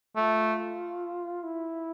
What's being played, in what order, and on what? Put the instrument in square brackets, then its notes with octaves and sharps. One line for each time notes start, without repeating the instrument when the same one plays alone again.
[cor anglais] A3 [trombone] F4
[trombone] E4